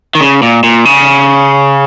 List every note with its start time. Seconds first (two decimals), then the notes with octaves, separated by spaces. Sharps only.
0.15 D#3
0.21 C#3
0.43 A#2
0.63 A#2
0.85 C#3